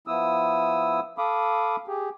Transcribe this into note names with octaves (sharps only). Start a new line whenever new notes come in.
F3 B3 E4 D#6 E6
A4 F5 B5 D6 D#6
G4 G#4